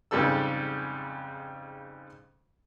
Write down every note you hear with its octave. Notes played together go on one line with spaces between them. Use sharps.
F2 G#2 C#3 G3 A4 E6